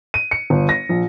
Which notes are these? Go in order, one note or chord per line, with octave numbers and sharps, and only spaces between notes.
D#7
C#7
G1
A#6
A#1